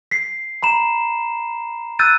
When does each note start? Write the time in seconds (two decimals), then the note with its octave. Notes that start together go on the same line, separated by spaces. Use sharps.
0.11 B6 C7
0.63 A#5 B5 E7
1.99 E6 F#6 G6 A6 D#7